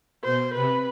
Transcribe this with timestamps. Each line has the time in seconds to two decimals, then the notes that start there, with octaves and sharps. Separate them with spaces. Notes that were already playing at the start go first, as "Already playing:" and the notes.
0.23 B2 C5
0.54 C3 B4